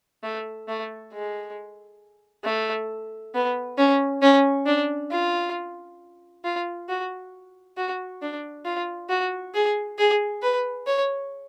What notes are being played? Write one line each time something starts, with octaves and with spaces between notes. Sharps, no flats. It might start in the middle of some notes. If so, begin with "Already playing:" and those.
A3
A3
G#3
A3
B3
C#4
C#4
D4
F4
F4
F#4
F#4
D4
F4
F#4
G#4
G#4
B4
C#5